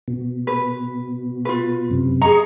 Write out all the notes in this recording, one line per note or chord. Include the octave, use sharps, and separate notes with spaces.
B2
B4
F4 B4
F#2 C3
G#4 D#5 A#5 C#6